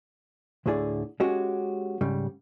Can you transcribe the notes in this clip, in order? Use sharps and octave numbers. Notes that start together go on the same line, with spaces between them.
D2 A2 D3 E4 G#4 D5
G#3 C#4 F#4 G4
G#2 C#3 G3